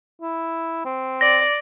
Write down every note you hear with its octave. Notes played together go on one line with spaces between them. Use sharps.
E4
C4
D5 A#6